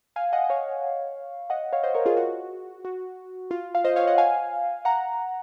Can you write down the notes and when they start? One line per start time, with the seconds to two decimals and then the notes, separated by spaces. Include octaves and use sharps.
0.16 F5 G#5
0.33 D#5 F#5
0.44 D#5
0.50 C#5 F5
1.50 D#5 F#5
1.73 C#5 F5
1.83 C5 D#5
1.94 A#4 C#5
2.06 F4 G#4
2.17 F#4
2.85 F#4
3.51 F4
3.75 F5
3.84 C5 D#5
3.96 C#5 F5
4.07 D#5 F#5
4.18 F5 G#5
4.85 F#5 A#5